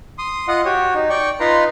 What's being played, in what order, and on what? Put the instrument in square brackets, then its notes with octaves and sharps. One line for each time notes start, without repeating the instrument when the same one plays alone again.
[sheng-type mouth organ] C6 D#6
F4 D#5 F#5 D#6
F#4 G4 C#5
D#4
D5 G5 C#6
D#4 F4 B4 A#5 C6